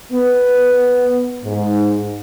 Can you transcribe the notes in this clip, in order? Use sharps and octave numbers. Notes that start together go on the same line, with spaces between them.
B3
G#2